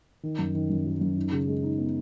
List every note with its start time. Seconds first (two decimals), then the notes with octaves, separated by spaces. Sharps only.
0.23 D#3
0.39 F#2
0.55 D#3
0.70 F#2
0.86 F#3
1.01 F#2
1.17 D#4
1.32 C#3
1.48 G#3
1.63 D#4
1.78 B3